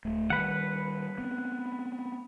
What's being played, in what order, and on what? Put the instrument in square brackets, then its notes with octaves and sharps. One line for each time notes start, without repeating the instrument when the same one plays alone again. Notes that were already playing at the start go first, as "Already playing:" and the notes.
[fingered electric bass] D1 A3
[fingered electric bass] D#3 G3 [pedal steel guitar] B4 F#5
[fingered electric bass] B3 C4